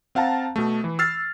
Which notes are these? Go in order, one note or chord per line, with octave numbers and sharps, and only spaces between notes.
C4 F5 F#5 A5 A#5
B2 A3
E3
E6 F6 A6 C7